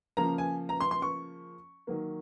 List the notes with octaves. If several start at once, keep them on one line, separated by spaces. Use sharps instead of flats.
C#3 F3 A#3 A#5
G#5
A#5
C6
C6
C#6
D#3 F#3 A#3